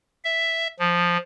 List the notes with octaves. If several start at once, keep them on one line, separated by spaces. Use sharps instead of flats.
E5
F3